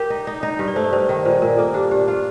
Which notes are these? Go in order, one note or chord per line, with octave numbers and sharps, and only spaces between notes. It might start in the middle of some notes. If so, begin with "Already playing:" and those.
Already playing: G4 A#4
D#4
D#4
D#4
G2
D5
A3 C5
D5
G2 C5
D#3 D5
A#2 C5
A#2 A#4
A#3 A4
D4 G4
D4 G4
F4